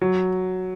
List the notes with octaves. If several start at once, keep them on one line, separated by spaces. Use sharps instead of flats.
F#3